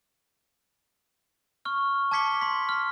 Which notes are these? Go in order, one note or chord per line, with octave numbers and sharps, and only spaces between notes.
C#6 F6
A5 D6 G#6 B6 C#7 G7
C6 B6
F6